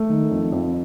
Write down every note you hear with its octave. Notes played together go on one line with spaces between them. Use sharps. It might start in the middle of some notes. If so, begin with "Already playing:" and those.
Already playing: A3
D#3
F2
F2